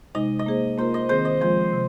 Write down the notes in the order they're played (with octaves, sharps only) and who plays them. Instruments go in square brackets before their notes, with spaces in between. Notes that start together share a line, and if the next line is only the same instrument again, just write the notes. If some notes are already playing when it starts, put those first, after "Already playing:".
[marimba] C3 G#3 D#4 [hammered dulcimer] D#5
[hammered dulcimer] D#5
[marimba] A#3 G#4 C5
[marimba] A#3 F4 A#4 [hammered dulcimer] C5
[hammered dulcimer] D#5
[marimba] D#3 C4 G#4 [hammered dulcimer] C5
[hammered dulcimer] D#5
[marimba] F3 G#3 F4 [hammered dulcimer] C5
[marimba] C3